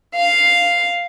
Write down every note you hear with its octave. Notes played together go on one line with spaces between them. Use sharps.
F5